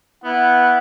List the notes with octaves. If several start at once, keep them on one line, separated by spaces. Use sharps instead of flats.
B3 E4 F#5